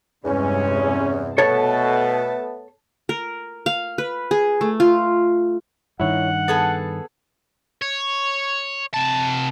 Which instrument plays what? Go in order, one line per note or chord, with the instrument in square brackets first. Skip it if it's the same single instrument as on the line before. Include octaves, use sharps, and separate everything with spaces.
[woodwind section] E2 [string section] G2 C3 G#3 [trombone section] C#4
[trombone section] B2 [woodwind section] A3 B3 [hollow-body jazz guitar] A4 C#5 [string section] A5
[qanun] A#4
F5
B4
G#4
A3
F4
[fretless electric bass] G2 D#3 [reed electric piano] E4 C#5 [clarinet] F#5
[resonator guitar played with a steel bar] B3 G#4 A4 [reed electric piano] A6
[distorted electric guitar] C#5
C3 A5